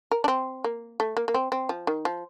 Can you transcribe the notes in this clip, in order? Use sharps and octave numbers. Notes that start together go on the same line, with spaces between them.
A#4
D4
C4
A#3
A3
A#3
A#3
C4
C4
F3
D#3
F3